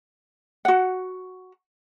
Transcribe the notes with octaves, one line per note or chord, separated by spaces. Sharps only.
F#4 F#5